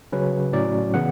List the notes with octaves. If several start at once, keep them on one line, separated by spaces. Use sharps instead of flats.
C#3 F#3 C#4 B4
A2 F#3 C#4 D5
C#3 E3 B3 F#5